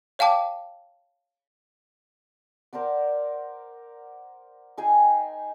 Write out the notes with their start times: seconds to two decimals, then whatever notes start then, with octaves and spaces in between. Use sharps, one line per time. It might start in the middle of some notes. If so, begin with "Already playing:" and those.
0.19 C#5 F5 G5 A5 D6
2.73 A#4 C5 D5 F#5
4.77 D#4 G#4 G5 G#5